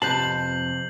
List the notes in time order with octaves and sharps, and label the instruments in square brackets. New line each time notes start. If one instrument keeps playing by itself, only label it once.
[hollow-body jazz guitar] F2 B4 A5 [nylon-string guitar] C3 [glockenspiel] G6 C7 [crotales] F#7